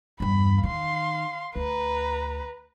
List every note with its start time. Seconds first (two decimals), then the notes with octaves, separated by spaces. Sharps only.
0.20 E2 G2 B5
0.63 D#3 F5 C6
1.56 D2 B4 A#5